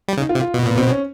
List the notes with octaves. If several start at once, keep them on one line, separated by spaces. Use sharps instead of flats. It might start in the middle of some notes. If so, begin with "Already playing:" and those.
G3
C#3 D#4
F4
C3
F4
B2
A#2 B3
B2 C4
C#4